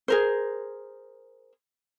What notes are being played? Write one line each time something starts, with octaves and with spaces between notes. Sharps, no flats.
G#4 A#4 C5